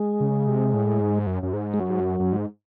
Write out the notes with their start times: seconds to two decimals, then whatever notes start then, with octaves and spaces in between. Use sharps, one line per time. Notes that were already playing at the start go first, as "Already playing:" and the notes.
Already playing: G#3
0.20 C#3
0.47 C3
0.74 A2
1.00 G#2
1.27 F#2
1.43 F#2
1.53 G#2
1.74 G#3
1.80 F#2 F#3
1.90 G#2
2.00 F#2
2.20 F#2
2.32 G#2